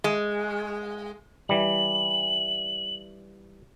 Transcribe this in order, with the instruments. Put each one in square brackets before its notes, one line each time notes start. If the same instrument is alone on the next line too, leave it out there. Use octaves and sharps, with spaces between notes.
[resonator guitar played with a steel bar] G#3
[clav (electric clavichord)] E3 G3 [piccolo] F#7